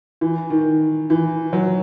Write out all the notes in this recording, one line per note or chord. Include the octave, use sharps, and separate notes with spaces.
E3
D#3
E3
F#3